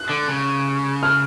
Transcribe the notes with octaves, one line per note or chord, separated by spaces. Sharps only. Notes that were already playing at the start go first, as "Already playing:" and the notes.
Already playing: F#6
D3
C#3
F6